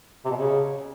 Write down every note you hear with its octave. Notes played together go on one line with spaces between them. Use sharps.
C3
B2
C#3